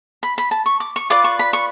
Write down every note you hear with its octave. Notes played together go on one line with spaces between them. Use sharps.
B5
B5
A5
C#6
D6
C#6
F4 B4 D5 D6
C#6
B5
C#6